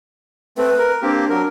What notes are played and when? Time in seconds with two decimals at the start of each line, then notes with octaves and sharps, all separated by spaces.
0.57 A3 C4 B4
0.79 A#4
1.02 A#3 C4 D4 G4
1.30 F#3 A#4